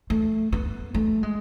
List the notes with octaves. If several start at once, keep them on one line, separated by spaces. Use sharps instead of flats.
A3
B3
A3
G#3